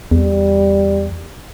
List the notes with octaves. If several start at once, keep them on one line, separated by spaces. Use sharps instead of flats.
E2 G3